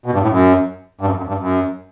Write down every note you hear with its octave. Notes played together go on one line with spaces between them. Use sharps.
B2
G2
A2
F#2
G2
F#2
F#2
G2
F#2